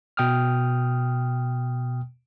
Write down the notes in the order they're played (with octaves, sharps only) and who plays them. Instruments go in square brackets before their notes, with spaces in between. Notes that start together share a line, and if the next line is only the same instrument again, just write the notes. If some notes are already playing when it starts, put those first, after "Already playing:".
[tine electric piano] B2 G5 D#6 F6